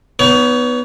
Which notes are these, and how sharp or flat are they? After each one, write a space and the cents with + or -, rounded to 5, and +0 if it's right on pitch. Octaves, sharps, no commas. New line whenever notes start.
B3 +0 D#4 +0 C#5 +30